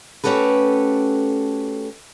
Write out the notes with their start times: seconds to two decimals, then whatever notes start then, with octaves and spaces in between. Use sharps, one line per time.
0.24 A3 C#4 F#4 G4 A4 B4